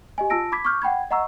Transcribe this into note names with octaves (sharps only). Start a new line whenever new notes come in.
G4 D#5 G#5
F4 A5 E6 A#6 D7
B5 D6 G#6 B6
C#6 D6 F6 G6
F#5 G5 B5 G#6
D#5 F#5 A#5 C#6 E6